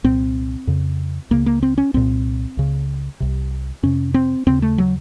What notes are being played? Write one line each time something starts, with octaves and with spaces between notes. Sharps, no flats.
C2 A#2 C4
F2 C#3
C#2 C#3 A#3
A#3
C4
C#4
C2 A#2 C4
C#2 C#3
C2 C3
F2 C3 C#4
C4
D#2 C#3 C4
A3
F#3